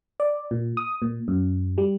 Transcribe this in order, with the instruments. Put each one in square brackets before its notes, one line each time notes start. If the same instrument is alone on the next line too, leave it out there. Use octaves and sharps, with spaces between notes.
[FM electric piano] D5
A#2
D#6
A#2
F#2
G3